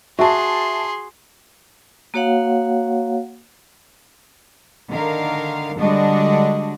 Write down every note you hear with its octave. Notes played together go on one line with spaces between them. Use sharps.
F#4 G#4 E5 A5 C6
A#3 F#4 C#5 F5 F#5
D3 D#3 A#4 F5
D3 G3 G#3 D4 F#4 D#5